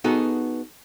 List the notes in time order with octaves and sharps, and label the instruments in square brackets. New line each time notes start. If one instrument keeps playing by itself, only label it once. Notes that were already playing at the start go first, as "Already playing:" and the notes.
[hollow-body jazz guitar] B3 D#4 F#4 G#4 A4